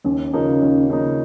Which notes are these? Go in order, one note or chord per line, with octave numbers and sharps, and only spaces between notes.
D#2 C#4
C#3 F3 A#3 D#4
D#2
C#3 F3 A#3 D#4